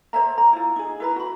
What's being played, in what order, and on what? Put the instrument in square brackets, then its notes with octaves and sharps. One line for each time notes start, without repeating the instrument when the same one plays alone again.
[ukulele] C5 C#5 E5 A#5
A#5
E4 F4
D#4 G#4
E4 B4 A#5
F#4 B5